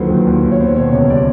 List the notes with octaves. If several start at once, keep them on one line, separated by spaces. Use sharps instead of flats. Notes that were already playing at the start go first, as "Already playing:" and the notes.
Already playing: D#2 D3 F3 F#3 B4 C5
D#2
D#2
D#2
C#5
B3 C5
B2 C#5
C#2 C#5
G3 D5